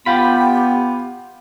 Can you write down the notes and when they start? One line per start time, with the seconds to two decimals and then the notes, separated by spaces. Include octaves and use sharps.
0.06 B3 F4 G4 G5 B5